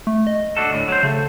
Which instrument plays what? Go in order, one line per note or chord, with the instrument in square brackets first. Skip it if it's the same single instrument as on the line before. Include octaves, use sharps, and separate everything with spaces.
[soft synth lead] A3
D#5
[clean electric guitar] D4 F#4 A4
D2 A2
F#3 C5
[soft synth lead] C#3 [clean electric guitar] A3